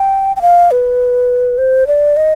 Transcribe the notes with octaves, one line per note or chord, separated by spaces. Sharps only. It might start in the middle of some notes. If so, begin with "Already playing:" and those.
Already playing: G5
G5
F5
B4
C5
D5
D#5